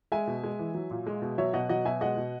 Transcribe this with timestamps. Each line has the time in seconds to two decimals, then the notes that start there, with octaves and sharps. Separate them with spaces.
0.12 G#3 E5 G#5
0.27 B2
0.43 G#3
0.59 E3
0.75 F#3
0.91 A#2
1.07 G#3
1.22 B2
1.38 F#3 C#5 E5
1.53 B2 D#5 F#5
1.69 F#3 D#5 F#5
1.85 B2 E5 G#5
2.01 G#3 D#5 F#5
2.17 B2